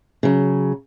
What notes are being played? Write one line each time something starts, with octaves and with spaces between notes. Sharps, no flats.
C#3 F#3